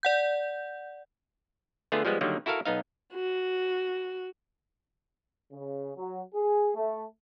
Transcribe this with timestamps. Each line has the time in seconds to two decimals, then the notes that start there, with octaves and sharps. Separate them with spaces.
0.03 D5 F#5 G6
1.92 D3 A3 B3 F4 G#4
2.05 F3 G3 G#3 B3
2.21 D3 D#3 F#3 G3 A#3
2.46 E4 F#4 A4 A#4 F5
2.65 B1 B3 D#4 F5
3.14 F#4
5.52 C#3
5.96 F#3
6.35 G#4
6.76 A3